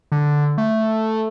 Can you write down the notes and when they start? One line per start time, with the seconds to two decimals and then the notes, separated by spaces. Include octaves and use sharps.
0.12 D3
0.58 A3